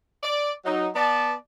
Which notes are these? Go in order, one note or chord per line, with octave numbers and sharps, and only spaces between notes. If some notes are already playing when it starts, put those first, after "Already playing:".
D5
F#3 D#4
B3 D5 A5